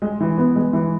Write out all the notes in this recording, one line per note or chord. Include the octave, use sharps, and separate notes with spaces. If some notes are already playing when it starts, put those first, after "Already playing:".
G#3
E3
B3
G#3
E3